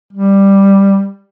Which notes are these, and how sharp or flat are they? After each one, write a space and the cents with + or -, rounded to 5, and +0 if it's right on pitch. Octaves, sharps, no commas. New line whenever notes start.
G3 +5